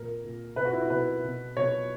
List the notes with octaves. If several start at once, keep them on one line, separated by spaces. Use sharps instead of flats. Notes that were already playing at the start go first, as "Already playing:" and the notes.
Already playing: A#2 A#4
A#2
B2 B4
F#4
E4
F#4
B2 B4
B2
B2 C#5